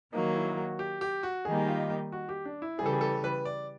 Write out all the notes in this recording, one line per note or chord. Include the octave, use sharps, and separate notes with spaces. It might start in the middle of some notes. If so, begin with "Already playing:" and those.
D#3 F#3 A#3 D#4
E4
F#4
G4
G4
F#4
D#3 G3 A#3 D#4 G4 G#4
F4
F#4
G4
D4
E4
C#3 E3 G3 G#4
A4
G#4
A4
B4
D5